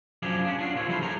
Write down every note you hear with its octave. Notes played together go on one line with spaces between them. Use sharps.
F#2 F3 D4 G4 G#4
C#4 D4
D4 F4 F#4
D#2 A#2 C4 C#5
F3 G3 E4 A4 A#4 C5
G#4 A#4 C#5 A#5